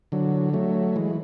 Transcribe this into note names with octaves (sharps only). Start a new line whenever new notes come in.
D3 F#3
F#3 A3
E3 G#3